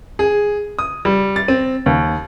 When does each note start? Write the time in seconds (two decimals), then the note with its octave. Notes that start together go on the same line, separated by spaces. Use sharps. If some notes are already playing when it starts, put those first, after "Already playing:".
0.19 G#4
0.79 D#6
1.05 G3
1.36 A6
1.48 C4
1.86 D#2